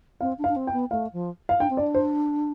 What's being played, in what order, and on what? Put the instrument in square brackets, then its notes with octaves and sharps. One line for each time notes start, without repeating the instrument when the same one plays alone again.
[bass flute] C4 [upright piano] F5
[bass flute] D4
[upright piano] F5
[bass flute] D4
C4
[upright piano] G5
[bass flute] B3
[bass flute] A3 [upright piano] F5
[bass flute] F3
[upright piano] F5
[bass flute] D4 [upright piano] G5
[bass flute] C4
[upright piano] D5
[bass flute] D4
[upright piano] C5